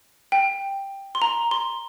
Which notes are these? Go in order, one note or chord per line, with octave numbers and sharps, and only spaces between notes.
G5
C6
A#5
C6